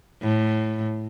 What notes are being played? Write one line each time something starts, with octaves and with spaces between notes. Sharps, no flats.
A2